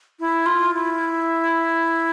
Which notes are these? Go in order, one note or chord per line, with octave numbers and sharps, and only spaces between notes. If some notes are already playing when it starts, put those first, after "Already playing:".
E4
F4
E4